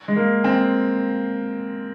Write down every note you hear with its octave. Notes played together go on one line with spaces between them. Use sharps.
G#3
A#3
C4